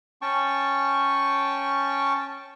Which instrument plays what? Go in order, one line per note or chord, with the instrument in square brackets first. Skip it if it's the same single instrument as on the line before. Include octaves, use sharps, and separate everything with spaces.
[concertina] C#4 G5 A5 C#6